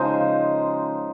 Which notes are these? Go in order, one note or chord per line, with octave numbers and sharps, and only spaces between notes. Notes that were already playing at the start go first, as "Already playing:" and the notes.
Already playing: C#3 F3 G#3 D#4 C5 G#5